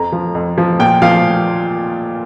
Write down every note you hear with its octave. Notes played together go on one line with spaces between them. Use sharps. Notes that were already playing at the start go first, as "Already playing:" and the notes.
Already playing: F2 A#5
F3
F2
F3
A#2 G5
F3 F5